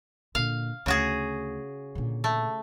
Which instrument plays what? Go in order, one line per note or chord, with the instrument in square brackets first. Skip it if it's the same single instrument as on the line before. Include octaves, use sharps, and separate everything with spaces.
[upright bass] A#2 D3 [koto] F5
[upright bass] D2 [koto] C#3 F#4 G#4
[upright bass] A#2 D3
[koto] A3